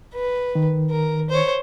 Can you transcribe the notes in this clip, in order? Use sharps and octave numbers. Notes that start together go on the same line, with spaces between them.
B4
D#3
A#4
C5 C#5